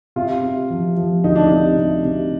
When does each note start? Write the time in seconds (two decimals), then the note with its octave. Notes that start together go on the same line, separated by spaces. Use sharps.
0.16 C3 F4
0.43 C3
0.70 F3
0.97 F3
1.24 D2 D#4
1.36 D4
1.47 C3 D#4
1.78 C3
2.05 C3